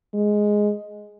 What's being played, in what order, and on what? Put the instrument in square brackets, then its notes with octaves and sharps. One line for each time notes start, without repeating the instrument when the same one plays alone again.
[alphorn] G#3